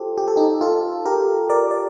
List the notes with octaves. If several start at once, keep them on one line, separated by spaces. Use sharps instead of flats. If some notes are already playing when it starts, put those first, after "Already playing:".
Already playing: F4 G4 A4 C5
G4
A4
D#4 G4
F4 A4
G4 A#4
A#4 D5
D5